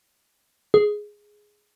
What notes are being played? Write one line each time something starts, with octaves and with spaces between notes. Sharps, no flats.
G#4